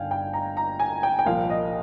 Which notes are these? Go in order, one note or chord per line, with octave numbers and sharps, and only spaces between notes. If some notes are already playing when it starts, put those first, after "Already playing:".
Already playing: G1 G2 D#3 F5 G5 G#5
G5
A#5
A#5
G#5
G5
G5
C2 A#2 F3 F5
D#5